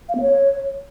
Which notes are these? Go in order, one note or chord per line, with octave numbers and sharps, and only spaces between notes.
F5
B3
C#5